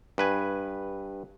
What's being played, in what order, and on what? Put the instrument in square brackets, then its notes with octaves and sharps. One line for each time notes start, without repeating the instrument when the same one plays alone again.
[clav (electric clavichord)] G2 B4 G#5